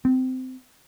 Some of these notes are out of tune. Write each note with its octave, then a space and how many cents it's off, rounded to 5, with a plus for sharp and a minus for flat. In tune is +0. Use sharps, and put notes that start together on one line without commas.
C4 -20